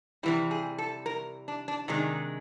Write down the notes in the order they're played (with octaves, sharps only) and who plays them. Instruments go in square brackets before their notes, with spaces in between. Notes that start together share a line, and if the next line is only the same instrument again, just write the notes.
[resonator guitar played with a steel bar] C3 E3 G3 E4
G#4
A4
A#4
D4
D4
C3 D#3 G#3 D4